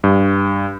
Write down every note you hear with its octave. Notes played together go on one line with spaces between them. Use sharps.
G2